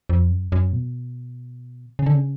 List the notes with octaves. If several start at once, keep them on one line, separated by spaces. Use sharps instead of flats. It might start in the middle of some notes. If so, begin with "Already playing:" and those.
F2
F#2
F#2
B2
C#3
D3
C#3